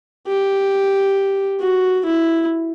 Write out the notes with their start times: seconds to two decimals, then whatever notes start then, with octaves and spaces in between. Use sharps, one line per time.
0.28 G4
1.60 F#4
2.05 E4